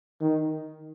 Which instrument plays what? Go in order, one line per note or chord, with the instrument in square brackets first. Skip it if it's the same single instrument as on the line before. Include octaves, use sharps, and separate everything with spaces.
[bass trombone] D#3